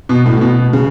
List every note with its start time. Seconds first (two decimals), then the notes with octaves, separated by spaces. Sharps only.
0.09 B2
0.26 A2
0.37 A2
0.41 B2
0.73 C#3